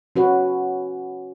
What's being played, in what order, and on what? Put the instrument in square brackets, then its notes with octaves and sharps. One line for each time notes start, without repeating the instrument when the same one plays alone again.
[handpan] C#4 F#4 B4